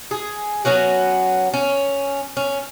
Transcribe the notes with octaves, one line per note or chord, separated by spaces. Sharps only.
G#4
F#3 B3 C#4 F#4
C#4
C#4